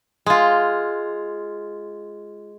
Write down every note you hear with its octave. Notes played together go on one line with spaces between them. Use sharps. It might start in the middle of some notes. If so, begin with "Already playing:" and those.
G#3 F4